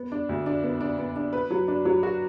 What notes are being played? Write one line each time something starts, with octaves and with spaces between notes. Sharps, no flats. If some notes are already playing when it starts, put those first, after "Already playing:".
Already playing: B3
D4
D2
D4
B3
D4
B3
D4
B4
F#3
D4
F#3
F#4